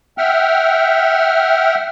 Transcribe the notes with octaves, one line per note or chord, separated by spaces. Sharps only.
E5 F#5 G5 F6